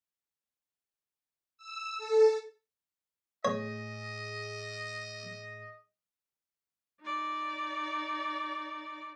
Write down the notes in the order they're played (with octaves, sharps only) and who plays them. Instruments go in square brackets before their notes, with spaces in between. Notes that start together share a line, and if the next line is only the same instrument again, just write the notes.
[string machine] E6
A4
[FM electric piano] A2 G#4 [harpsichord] C#5 [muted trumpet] D#5
[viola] D#4 D5